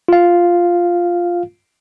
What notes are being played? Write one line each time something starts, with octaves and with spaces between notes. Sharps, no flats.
F4 F5